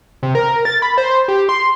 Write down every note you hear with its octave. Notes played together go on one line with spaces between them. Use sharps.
C3
A#4
A6
B5
C5
G4
C6